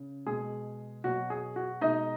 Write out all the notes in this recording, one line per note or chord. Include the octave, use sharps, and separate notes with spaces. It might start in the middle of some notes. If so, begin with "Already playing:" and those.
Already playing: C#3
B2 G#3 G#4
B2 F#3 F#4
G#4
F#4
B2 G#3 D#4 D#5